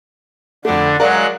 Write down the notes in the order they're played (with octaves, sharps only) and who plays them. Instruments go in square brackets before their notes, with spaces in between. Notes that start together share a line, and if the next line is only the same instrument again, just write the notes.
[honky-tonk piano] F2 A3 [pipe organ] D3 D4 [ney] F#5
[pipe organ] F#3 G#3 F#6 [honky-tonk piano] A#4 D5 F5